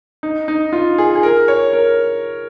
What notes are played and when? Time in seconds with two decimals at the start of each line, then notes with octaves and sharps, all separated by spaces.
0.23 D#4
0.48 D#4
0.73 F4
0.98 G#4
1.15 G#4
1.23 A#4
1.48 C#5
1.73 A#4